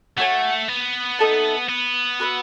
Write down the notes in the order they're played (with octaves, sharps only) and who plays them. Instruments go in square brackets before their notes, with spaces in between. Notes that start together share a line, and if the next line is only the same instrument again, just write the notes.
[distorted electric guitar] A3 [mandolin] F#4 C#5 G#5
[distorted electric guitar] B3
[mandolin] D#4 A4 E5 A5
[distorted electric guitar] B3
[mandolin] F#4 B4 E5